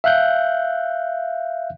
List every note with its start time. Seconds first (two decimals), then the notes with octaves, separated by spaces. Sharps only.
0.04 E5 F5 F#6 G6